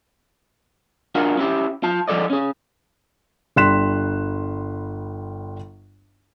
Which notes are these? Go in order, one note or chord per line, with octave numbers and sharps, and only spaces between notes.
D4 F4 F#4 G#4 A#4 F#5
C#4 E4 G4
F4 A5
F3 G#4 A4 D5 D#5
C#4 G#4
G1 G3 C6 F#6 B6 E7